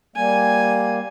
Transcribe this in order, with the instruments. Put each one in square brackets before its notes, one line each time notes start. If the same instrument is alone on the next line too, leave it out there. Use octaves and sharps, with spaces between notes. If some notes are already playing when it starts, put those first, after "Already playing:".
[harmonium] G3 A#3 [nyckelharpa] G#5